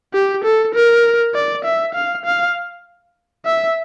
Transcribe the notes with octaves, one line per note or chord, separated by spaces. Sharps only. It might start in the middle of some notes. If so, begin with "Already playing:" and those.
G4
A4
A#4
D5
E5
F5
F5
E5